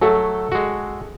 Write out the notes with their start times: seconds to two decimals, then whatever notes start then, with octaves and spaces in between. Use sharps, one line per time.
0.01 F#3 A3 A4
0.52 G#3 F#4